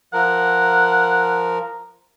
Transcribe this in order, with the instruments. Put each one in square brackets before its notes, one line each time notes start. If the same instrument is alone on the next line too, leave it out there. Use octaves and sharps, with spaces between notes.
[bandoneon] F3 A#4 [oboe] F#5